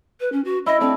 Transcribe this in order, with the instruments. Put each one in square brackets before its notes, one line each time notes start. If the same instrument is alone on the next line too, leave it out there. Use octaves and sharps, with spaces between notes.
[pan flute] B4
C#4
F#4
[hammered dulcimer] E4 [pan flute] D#5
[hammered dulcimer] A3 D4 [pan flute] C4